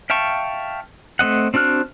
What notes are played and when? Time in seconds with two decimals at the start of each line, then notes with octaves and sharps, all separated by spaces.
0.10 E5 F5 G5 A5 C#6
1.19 A3 C4 D#5 F#5
1.54 C4 D4 F#4 F6 F#6